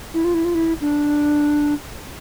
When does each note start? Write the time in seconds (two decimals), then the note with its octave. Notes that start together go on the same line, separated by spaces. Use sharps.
0.14 E4
0.25 F4
0.34 E4
0.45 F4
0.55 E4
0.81 D4